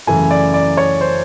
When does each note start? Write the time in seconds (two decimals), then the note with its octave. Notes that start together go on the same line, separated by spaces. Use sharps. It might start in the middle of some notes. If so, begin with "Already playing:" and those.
0.07 F#2 C#3 E3 A3 G#5
0.31 D5
0.54 D5
0.77 C#5
1.01 C5